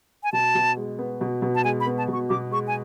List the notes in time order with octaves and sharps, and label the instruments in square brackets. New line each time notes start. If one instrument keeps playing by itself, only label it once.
[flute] G#5
[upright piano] B2 [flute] A5
[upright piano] B2
G#3
B3
B2
B2
[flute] A5
[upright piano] G#3 [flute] G#5
[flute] B5
[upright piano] B3
[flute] A5
[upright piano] B2 [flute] C#6
[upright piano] B2 [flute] D6
[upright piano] G#3 [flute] C#6
[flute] G#5